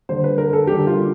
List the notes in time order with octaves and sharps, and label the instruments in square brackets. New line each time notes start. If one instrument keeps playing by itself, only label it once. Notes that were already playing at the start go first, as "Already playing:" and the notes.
[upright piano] D3 G3 C5
B4
A#4
A4
D3 G3 G4
F4